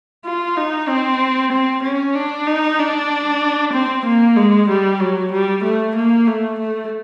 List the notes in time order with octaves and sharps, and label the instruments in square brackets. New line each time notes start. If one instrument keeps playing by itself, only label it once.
[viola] F4
D#4
C4
C4
C#4
D4
D#4
D4
C4
A#3
G#3
G3
F#3
G3
A3
A#3
A3
A3